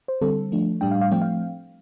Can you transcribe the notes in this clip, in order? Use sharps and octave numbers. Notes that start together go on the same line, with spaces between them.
C5
D3 G3 C4 A4
F3 A3 D4
A2 G3 D4 G5
F5
F5
F3 A3 C4 G5
F5